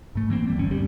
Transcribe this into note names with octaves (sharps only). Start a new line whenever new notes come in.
G#2 A3
E3 A#3 C4
D#1 G3
G1 C#4
D2 G3